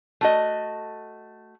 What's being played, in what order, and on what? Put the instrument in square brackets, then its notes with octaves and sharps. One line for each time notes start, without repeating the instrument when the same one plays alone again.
[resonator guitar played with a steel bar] A3 F#4 D#5